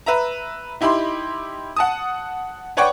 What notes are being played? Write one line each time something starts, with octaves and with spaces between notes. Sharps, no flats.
B4 E5 A#5
D#4 E4 G4 B5 C6
F#5 A5 D#6
B4 C#5 D5 F#5 G5 C#6